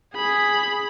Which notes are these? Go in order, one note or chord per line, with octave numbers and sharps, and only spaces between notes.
G#4 B5